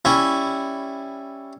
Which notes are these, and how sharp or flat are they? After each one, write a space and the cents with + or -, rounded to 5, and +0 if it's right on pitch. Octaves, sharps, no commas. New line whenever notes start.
G3 +5 C#4 +0 E4 +0